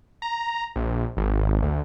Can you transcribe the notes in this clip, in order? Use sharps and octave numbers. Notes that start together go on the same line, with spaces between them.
A#5
A#1
G#1
D2